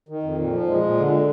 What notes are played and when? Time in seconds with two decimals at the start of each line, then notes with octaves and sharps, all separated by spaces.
0.09 D#3
0.23 F2
0.38 A#2
0.53 F3
0.67 A#2 G#3
0.83 A#2
0.97 D3